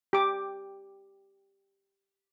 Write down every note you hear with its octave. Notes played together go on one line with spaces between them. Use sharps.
G4 D6